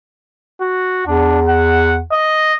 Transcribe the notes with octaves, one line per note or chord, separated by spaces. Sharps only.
F#4
E2 D4
F#5
D#5